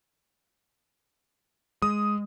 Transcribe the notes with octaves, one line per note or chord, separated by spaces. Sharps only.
G#3 D#6